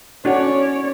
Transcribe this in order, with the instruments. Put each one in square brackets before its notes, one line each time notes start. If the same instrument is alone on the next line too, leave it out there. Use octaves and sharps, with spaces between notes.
[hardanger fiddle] C#4 [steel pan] D4 F#4 [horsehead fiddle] C#5 D5